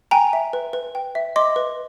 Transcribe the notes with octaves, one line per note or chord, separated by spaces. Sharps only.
G5 G#5 A#5
E5
B4
B4
G5
E5
D#5 C6 D6
B4